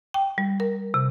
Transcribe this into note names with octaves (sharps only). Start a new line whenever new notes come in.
G5
G3
A#4
C3